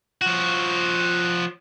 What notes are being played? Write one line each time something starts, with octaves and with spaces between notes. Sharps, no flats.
F3 F#4